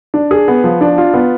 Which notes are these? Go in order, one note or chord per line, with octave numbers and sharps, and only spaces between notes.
D4
G#4
B3
F3
D4
F4
B3